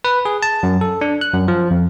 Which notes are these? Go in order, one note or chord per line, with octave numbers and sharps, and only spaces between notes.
B4
G#4
A5
F#2
A4
D4
F#6
F#2
F3
F2